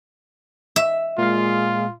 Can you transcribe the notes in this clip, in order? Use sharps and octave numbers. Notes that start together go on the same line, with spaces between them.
E5
A#2 G#3 F4 F5